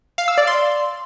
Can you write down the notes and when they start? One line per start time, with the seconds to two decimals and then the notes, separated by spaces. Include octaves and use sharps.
0.18 F5
0.28 E6
0.38 D5
0.47 C6